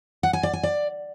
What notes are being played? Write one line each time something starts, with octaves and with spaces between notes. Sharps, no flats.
F#5
G#5
D5
G#5
D5